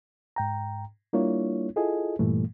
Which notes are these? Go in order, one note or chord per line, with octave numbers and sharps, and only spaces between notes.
G#2 G5 A#5
G3 A#3 D4 E4 F4 C#5
E4 F4 G#4 A4 D#5 G#5
G2 A#2 E3 G3 A3